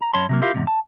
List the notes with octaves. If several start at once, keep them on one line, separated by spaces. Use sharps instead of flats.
A#5
F#2 C#4 C#5 A5 B5 C6
C3 F#3 A#3
E4 F4 G4 A#4 F5
E2 G#2 C3
A5